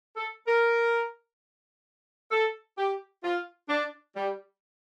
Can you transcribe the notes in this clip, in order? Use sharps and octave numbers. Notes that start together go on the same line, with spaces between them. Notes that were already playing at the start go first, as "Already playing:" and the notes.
A4
A#4
A4
G4
F4
D4
G3